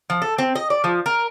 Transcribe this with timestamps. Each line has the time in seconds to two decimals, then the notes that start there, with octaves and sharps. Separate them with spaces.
0.10 F3
0.22 A4
0.38 C4
0.56 D#5
0.70 D5
0.84 F3
1.06 A#4